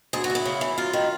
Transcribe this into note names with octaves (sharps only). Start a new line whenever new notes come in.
D2 G#4
F#4
D2
E4
C#3
E3
F#2 F4
D#3